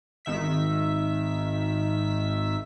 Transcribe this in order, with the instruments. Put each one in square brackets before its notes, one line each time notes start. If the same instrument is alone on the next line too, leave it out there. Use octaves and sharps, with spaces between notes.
[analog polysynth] G#1 D#3 E5 B6